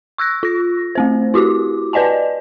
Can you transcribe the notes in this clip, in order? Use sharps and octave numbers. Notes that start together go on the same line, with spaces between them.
C#6 E6 F#6 A#6
F4 A#6
A3 C4 C5
E4 F#4 G4 D6
B4 D5 D#5 G#5 A5